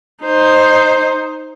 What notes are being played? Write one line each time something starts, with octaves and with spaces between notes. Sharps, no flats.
D#4 C5